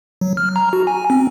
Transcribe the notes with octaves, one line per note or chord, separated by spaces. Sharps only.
F#3
F6
A#5
F#4
G#5
C4